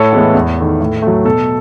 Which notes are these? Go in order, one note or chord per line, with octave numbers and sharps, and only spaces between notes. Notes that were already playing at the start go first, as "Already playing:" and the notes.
Already playing: A2 A4 C#5
E3 G#3 B3
E2
D#3 A3
A2
F#3 A3
B2 A4